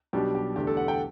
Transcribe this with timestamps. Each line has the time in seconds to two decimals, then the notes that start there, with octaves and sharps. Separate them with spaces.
0.13 B1 B2 G3 D4 G4
0.35 G4
0.56 E2 D3 A3 D4 G4
0.67 A4
0.77 F#5
0.88 G5